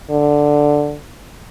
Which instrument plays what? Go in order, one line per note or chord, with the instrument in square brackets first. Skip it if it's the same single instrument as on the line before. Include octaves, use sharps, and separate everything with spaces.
[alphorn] D3